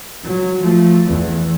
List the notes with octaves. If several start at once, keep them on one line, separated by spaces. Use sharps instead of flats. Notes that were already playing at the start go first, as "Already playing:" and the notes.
F#3
F3 A3
E2